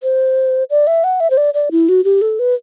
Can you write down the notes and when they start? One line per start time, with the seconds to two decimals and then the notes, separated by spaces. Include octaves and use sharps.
0.03 C5
0.70 D5
0.87 E5
1.04 F#5
1.20 E5
1.30 C5
1.37 D5
1.54 D5
1.71 E4
1.89 F#4
2.04 G4
2.22 A4
2.39 B4